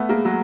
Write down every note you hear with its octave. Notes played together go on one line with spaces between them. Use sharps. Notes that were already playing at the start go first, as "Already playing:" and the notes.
Already playing: A3 B3
G#3 A#3
F#3 G#3